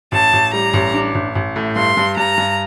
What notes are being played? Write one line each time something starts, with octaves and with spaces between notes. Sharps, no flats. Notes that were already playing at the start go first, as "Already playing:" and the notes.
A1 A5
A1
G3 A#5
A1
D4
A1
A1
A2
G2 C6
G2
G2 A#5
G2